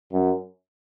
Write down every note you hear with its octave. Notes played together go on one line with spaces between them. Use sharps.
F#2